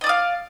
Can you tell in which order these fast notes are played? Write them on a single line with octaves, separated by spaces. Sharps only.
D#5 D5 D#6 F5